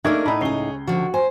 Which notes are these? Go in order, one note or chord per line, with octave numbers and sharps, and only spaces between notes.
A3 A#3 D4 D#4 G#4 A#4 E5 G#6
A2 D#4 B5
C#2 G#4 C#5 C7 G7
D3 F3 F#4
C5 G#5